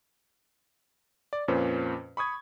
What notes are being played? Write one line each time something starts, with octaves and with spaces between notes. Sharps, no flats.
D5
F2 A#2 C#4 B4 C5
B5 C#6 D#6 G#6